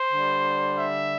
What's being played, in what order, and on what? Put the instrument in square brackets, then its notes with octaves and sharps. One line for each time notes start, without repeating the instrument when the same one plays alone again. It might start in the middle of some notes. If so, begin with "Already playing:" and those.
Already playing: [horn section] C5
D3 G3
E5